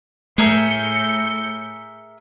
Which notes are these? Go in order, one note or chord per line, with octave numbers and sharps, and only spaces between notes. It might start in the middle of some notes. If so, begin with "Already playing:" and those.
A2 A3 G#4 A#4 E5 G6 C#7